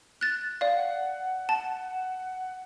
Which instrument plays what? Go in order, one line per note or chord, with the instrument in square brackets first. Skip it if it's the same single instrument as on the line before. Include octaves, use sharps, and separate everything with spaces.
[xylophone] F#6 A6
D5 F5
[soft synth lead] F#5
[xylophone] A5